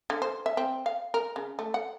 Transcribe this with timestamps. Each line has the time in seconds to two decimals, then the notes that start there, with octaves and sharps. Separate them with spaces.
0.10 D3
0.22 C5
0.46 E5
0.57 C4
0.86 F5
1.14 A#4
1.36 C#3
1.59 A3
1.74 F#5